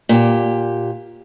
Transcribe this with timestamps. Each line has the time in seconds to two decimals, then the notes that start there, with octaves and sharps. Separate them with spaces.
0.09 A#2 G4